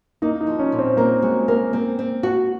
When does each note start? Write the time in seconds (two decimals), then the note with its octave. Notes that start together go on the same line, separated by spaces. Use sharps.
0.22 A#3 D#4
0.41 D#4
0.47 F3
0.59 C#4
0.72 A#2
0.79 C4
0.97 A#3 A#4
1.22 G#3 F#4
1.48 A#3 A#4
1.73 A#3 C4
1.99 C4
2.23 F#4